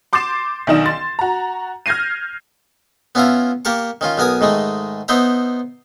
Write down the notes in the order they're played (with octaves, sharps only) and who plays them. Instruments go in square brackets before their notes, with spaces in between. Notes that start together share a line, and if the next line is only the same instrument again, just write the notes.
[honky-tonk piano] C6 D6 G6 A6 C7 E7
B1 D#3 D4 D#4 D#5 E7
C6 A6
F#4 A#5
F6 G6 G#6 A#6 C7 D#7
[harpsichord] B3 C#4 E4 F4 E5 A#5
A#3 G4 A#4 A5 C#6
D#3 C#4 F4
B1 B3 A#4 G#5 D#6
G#2 D#3 G#3 A3
B3 D#4 C5 E5 A#5